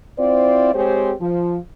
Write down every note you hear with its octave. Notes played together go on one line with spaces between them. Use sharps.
C4 E4 F4 C5 D5
G#3 C4 G4 G#4 C5 C#5
F3